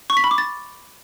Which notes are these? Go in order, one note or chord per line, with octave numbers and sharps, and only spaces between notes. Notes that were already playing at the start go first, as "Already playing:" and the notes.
C#6
B6
B5
D6
A6